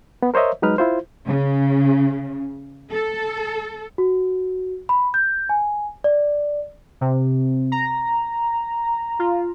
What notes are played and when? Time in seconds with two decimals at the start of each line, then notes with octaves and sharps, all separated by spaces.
0.23 B3
0.34 A#4 C5 C#5 D#5 E5
0.62 F#3 G#3 D#4 B4 F6
0.78 E4 F4 C5
1.27 C#3
2.92 A4
3.98 F#4
4.89 B5
5.14 G6
5.49 G#5
6.04 D5
7.01 C3
7.72 A#5
9.19 F4